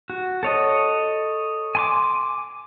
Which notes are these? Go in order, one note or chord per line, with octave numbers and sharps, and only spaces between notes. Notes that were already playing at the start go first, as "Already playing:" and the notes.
F#4
A4 C#5 D#5
G#5 C6 D6